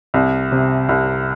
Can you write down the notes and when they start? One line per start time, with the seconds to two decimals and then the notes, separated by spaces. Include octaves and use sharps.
0.14 C2
0.52 C3
0.89 C2